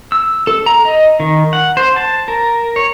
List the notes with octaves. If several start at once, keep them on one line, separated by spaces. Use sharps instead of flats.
E6
A4
A#5
D#5
D#3
F#5
C5
A5
A#4
C#5